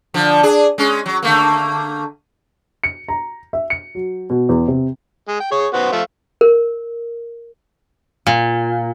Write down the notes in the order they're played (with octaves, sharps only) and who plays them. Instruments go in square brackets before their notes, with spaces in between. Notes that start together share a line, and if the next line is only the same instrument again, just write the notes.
[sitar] D3 F3
D4 G#4
G#3 C#4
F#3
D3 A3 A#3
[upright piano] C#7
A#5
E5
C#7
F#3
B2
E2
C3
[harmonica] G#3
G5
G#4 C#5
B3 F#4 C5
F3 A3 F4
[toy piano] A#4
[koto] A#2